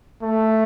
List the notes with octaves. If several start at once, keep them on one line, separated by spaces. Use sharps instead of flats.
A3